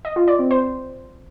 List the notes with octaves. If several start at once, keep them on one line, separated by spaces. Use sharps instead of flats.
D#5
F4
D5
C4
C5